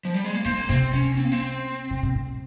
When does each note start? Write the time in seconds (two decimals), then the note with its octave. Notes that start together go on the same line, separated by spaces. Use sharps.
0.05 F3
0.14 G3
0.25 G#3
0.34 A#3
0.44 D#3 C4
0.58 A#3
0.69 C3 C4
0.93 C3 C#4
1.17 C4
1.24 A#3
1.32 C4
1.91 C#3
2.03 C3
2.15 A#2